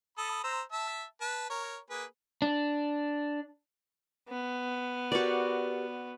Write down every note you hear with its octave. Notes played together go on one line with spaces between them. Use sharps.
A4 B5 D#6
C5 A#5 E6
E5 A5
B4 A5
A#4 C#5
A#3 G#4 B4
D4
B3
F#4 G4 A#4 B4 D5